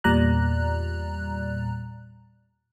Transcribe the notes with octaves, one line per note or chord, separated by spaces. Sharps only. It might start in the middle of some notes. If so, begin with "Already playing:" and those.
E2 A#2 G3 D5 A#5 F#6